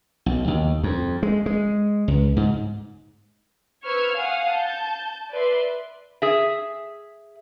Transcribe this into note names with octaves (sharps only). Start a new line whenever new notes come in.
B1
D#2
F2
G#3
G#3
C#2
G#2
B4 C5 C#6 E6 F6 G#6
F5 F#5 G#5 D#6
A5 G6
B4 D5 E5 C6
G#4 E5